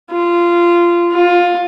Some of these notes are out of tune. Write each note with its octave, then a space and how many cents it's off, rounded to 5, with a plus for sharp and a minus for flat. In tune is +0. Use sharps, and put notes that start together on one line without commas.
F4 -15
F4 +15